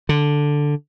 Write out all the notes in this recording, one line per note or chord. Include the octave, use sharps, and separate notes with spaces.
D3